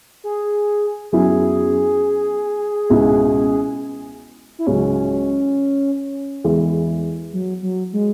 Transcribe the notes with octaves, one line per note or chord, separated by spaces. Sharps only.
G#4
F#2 F#3 B3 E4 G#4
C#2 B2 B3 E4
E4
C#2 C#3 F#3 C#4
E2 E3 G#3
F#3
F#3
G#3